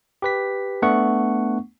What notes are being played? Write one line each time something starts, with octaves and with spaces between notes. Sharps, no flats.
G4 B4 B6
A3 B3 D4 F#5 C#6